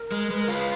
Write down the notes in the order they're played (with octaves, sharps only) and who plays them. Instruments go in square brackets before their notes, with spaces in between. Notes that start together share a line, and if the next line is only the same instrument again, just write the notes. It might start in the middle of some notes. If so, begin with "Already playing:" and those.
Already playing: [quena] A#4
[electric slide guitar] G#3
[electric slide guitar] G#3 [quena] B4
[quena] A#4
[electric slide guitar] F4 [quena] B4